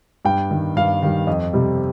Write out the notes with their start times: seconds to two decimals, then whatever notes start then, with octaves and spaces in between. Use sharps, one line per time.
0.25 G2 G5
0.51 D#3 G3
0.76 G2 F5
1.02 D#3 G3
1.27 F2 D#5
1.53 C3 G3